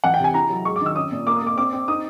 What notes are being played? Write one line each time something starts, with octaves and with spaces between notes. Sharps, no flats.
E3 F#5
G5
C3 G#5
E4 A#5
F#3
G#3 C#6
D6
D#3 E6
C#4 D#6
A#2
A#3 D6
D#6
A#3 D6
C4 D6
C4
D#4 D#6